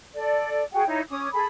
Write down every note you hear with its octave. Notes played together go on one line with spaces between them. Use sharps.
A4 D5
F#4 G#4 F#5 G5
D#4 E4 C#5
C#4 C#5 D6 D#6
G#4 A4 B5